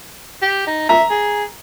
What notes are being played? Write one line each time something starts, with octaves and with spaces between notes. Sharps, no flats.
G4
D#4
E5 A#5
G#4